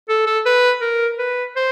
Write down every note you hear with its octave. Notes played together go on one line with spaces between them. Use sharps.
A4
A4
B4
A#4
B4
C5